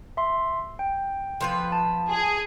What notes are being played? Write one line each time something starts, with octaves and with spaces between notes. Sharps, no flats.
E5 C6
G5
F3 B3 B4
A5
G#4